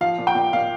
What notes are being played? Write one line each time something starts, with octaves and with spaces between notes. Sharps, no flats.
F3 F5
A#2
G5
A#2
A#2 F5